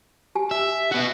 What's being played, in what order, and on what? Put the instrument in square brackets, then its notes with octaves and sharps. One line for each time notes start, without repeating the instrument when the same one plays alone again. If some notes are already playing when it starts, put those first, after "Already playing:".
[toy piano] G4 G#5
[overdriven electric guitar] E5
B3 F#4